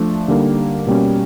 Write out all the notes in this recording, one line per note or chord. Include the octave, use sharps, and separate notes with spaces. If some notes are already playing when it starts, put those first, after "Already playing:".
Already playing: F3 A3 D4
D3 G3 A#3 D#4
B2 G3 A#3 C#4